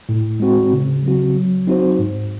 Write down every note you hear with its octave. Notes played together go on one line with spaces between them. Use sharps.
A2
G#3 C4 F#4
C#3
F#3 C4 F#4
F#3
C4 D#4 F#4 C5
G#2